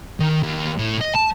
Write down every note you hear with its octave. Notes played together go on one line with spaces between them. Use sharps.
D#3
D#2
A2
D#5
A5